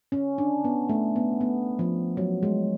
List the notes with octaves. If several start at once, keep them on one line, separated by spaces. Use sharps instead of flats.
C#4
D4
B3
A3
B3
B3
F3
F#3
G#3